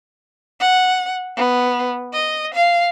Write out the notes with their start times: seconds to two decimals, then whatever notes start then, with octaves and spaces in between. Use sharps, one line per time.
0.60 F#5
1.37 B3
2.13 D#5
2.54 F5